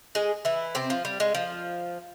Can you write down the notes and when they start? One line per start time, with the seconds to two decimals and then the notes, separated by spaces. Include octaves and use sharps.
0.15 G#3 G#4
0.45 E3 E4
0.75 C3 C4
0.90 F3
1.05 G3
1.20 G#3
1.35 F3